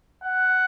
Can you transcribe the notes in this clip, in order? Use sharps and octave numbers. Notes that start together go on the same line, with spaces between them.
F#5